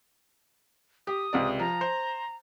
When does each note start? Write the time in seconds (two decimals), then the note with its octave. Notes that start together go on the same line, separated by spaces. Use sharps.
1.07 G4 D#6
1.33 C#2 C3 D5
1.59 F3 A#5
1.81 C5